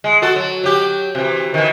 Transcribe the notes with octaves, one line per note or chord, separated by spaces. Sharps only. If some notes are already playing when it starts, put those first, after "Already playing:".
G#3
F#4 A4
F#3
F#3 G4
C3 E3
D#3 E3